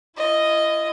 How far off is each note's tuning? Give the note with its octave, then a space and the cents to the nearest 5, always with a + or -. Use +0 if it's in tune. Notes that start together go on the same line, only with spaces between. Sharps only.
E4 +40 D#5 +0